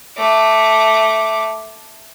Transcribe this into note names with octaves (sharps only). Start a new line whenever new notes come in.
A3 D6